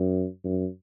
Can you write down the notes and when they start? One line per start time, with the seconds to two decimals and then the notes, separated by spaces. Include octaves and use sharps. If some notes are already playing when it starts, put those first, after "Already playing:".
Already playing: F#2
0.44 F#2